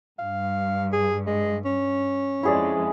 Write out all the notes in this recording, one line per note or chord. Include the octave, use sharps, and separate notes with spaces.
G2 F5
G#4
G#3
C#4
F2 G#3 E4 G#4 D5